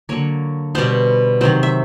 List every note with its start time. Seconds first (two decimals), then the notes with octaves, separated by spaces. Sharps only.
0.09 D3 F#3 A#3 C#5
0.75 B2 G3 B3 C5
1.41 C3 D#3 F#3 C5
1.63 E5